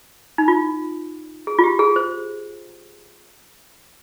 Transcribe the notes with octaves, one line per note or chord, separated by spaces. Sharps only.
D#4
F4
G#4
F4
G4
G#4
C5